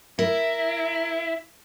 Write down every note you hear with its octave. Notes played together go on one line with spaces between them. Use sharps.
E4 A#4